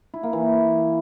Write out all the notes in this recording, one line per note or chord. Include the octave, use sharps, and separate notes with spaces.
E4
A#3
E3